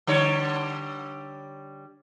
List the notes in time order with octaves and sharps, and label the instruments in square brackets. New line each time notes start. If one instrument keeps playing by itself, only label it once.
[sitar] D3 G3 C#5